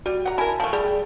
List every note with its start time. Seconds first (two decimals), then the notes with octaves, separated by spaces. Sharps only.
0.06 G3 F#4
0.26 F#5 A#5
0.38 E4 A#4 G#5 A5
0.60 F3 A3
0.73 G3 G#4